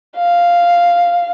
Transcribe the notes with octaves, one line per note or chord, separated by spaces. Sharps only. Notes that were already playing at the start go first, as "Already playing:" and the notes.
F5